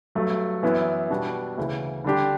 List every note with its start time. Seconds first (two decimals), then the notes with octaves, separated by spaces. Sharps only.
0.15 G2 F#3 A3
0.63 F#2 E3 B3 E4
1.10 B2 G3 D4 F#4
1.58 D2 C#3 E3
2.04 D3 G3 D4 G4